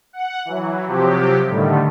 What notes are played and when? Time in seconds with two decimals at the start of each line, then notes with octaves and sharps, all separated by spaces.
0.13 F#5
0.45 E3 F#3
0.87 C3 F3 F#3 G4
1.49 A2 D3 D#3 G3 A3